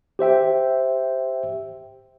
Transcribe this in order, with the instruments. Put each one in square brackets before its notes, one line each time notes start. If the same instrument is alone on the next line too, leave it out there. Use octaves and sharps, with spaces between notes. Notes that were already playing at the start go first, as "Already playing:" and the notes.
[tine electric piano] G4 C5 E5 G5